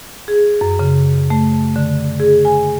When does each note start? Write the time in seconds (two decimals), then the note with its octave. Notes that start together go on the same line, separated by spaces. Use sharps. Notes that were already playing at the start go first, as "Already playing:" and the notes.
0.28 G#4
0.61 F#2
0.79 C#3
1.30 A3
1.76 D3
2.20 G#4
2.45 G#5